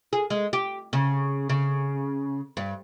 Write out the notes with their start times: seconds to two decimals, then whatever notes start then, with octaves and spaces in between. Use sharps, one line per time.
0.13 G#4
0.30 G#3
0.53 G4
0.93 C#3
1.49 C#3
2.57 G2